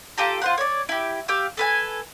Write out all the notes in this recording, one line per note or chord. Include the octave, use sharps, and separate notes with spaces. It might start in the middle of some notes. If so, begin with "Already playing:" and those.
F4 G4 A4 A#5
F4 C5 F#5
C#5 D5
E4 G4
G4 F5 E6
A4 B4 G#5